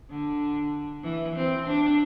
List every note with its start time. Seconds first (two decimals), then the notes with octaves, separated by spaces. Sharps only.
0.10 D3
1.04 E3
1.36 C4
1.67 D4